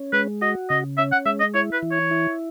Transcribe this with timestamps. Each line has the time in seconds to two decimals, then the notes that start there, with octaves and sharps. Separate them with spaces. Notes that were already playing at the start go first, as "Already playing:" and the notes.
Already playing: C#4
0.13 G#3 B4
0.41 F#4 D#5
0.70 C#3 D#5
0.98 C#4 E5
1.12 F#5
1.26 G#3 E5
1.40 D#5
1.54 E4 C#5
1.73 B4
1.83 E3
1.92 C#5
2.11 E4